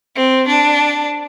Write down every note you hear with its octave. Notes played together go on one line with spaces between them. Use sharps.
C4
D4